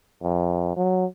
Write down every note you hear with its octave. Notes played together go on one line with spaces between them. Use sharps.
F2
F#3